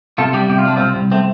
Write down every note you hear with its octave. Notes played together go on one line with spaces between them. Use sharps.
C3 F4 A4
G3 D4 G4
C3 G4
F4
G3 D4
C2 C4 F4
C2
A3 C4